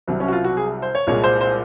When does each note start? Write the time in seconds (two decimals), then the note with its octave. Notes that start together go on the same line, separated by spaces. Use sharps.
0.08 C2 C3 F#3
0.20 C#4
0.28 F#4
0.32 F4
0.44 F#4
0.57 G#4
0.82 C5
0.95 C#5
1.07 C2 A#2 G#3 C#5
1.24 C5
1.41 C5